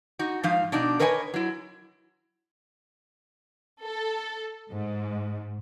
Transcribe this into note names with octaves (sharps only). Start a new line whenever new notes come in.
D#4 F#4
G#2 F3 D#4 F5
B2 D4 D#4
A#4 B4 C#5 D#5 F#5 G#5
F#3 E4
A4
G#2